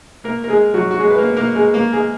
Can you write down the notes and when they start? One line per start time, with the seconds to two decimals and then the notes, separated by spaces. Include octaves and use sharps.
0.24 A#3 A#4
0.44 A#4
0.49 G#3 G#4
0.74 F#3 F#4
0.91 F#4
1.00 G#3 G#4
1.10 B4
1.18 A#3 A#4
1.37 A#3 A#4
1.55 G#3 G#4
1.74 A#3 A#4
1.93 G#3 G#4